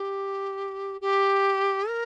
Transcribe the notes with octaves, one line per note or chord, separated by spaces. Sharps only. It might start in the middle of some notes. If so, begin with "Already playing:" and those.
Already playing: G4
G4
A#4